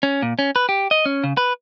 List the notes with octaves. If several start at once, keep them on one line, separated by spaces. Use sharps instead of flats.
C#4
A#2
C#4
B4
G4
D#5
C#4
C#3
B4